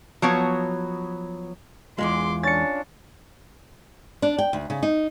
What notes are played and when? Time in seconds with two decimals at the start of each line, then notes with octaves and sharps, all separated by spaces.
0.22 F3 F#3 B3 C#5
1.98 E2 G#2 G#3 F4 C6 D6
2.43 C#4 D4 A6 C#7
4.22 D4
4.38 G5
4.53 D2
4.70 C#3
4.83 D#4